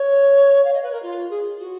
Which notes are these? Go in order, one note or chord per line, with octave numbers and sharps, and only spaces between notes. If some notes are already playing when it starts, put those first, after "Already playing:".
Already playing: C#5
F5
D#5
B4
A#4
F4
G#4
F#4